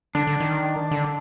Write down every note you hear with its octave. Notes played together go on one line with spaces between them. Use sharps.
D3 D4
D3
D#3
D3